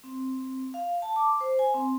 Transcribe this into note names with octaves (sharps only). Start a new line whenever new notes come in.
C4
F5
A5
D6
C5
G#5
C4